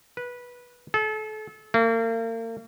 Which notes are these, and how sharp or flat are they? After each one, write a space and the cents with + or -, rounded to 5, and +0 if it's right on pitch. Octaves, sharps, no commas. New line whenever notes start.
B4 -15
A4 -35
A#3 -40